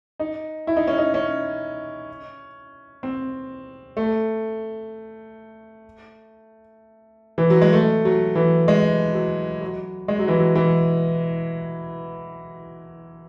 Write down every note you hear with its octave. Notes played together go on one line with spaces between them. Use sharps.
D#4
E4
D#4
C#4
D#4
C#4
C4
A3
E3
F#3
G#3
A3
F#3
E3
G#3
F#3
F#3
G#3
F#3
E3
F#3
E3